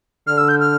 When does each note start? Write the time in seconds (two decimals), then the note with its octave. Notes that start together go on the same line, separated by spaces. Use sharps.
0.27 D3 F6
0.38 E6
0.49 G6
0.60 F6